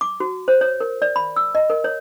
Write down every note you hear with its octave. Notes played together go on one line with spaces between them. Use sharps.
D6
F#4
C5
C#5
A#4
D5
B5
E6
D#5
A#4
C#5